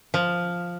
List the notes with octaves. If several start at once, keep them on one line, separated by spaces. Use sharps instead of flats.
F3